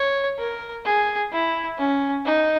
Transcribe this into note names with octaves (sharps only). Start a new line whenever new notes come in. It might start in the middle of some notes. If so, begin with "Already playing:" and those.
Already playing: C#5
A#4
G#4
E4
C#4
D#4